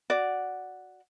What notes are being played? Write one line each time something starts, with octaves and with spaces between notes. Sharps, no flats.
F#4 D5